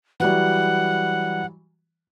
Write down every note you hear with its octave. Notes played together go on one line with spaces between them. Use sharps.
E3 F#3 G3 F#5